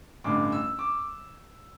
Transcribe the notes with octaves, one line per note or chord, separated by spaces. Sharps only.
A1 G2 D3 D6
E6
D6